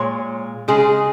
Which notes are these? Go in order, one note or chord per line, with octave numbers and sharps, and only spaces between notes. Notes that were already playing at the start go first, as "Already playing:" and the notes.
Already playing: A#2 G#3 C#5
C#3 G#3 G#4